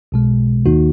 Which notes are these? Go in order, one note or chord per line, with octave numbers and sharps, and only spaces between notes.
B1 B2 G#3
D#2 D#3 A#3 D#4 F#4